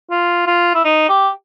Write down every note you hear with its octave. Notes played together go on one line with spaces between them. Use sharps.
F4
F4
E4
D#4
G4